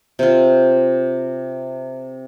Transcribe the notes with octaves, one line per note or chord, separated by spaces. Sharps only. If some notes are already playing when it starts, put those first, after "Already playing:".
C3 F4